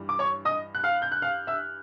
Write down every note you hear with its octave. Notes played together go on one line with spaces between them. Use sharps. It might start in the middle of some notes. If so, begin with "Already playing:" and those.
Already playing: G2 E3 G3
D6
C#5 C#6
D#5 D#6
F#6
F5 F6
G6
F#6
F5 F6
E5 E6